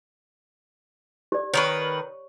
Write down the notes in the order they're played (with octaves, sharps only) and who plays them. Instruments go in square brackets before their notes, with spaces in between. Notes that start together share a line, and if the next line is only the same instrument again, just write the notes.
[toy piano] G4 D5
[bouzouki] D#3 A#4 B4 [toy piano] C#5 C#6